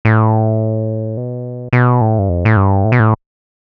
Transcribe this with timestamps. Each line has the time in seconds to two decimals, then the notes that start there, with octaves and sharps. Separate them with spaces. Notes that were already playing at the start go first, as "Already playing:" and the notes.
0.05 A2
1.17 B2
1.73 B2
2.01 A2
2.19 G2
2.29 F2
2.45 A2
2.57 G2
2.85 A2
2.92 B2
3.00 A2